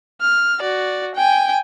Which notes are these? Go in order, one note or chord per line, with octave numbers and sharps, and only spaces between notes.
F6
F#4 D5
G5 G#5